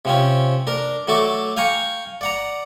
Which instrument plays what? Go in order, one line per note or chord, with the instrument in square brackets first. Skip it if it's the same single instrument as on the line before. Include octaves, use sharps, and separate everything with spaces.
[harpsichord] C3 F3 C4 C#4
D4 A#4
F#3 A3 F#4 A5 D6
F5 G5 G#5 A#5 C#6
D5 F#5 A#5